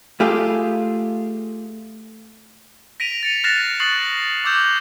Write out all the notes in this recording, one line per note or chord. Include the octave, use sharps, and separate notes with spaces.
A3 F4 G4 G#4
A#6 B6 D7 D#7 F7
A6 C#7 F7
F6 F#6 A6 A#6 C7 E7
C#6 D#6 F#6 A6 C7 F#7
C#6 D6 E6 G6 E7